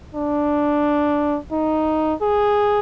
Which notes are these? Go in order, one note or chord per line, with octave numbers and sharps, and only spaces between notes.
D4
D#4
G#4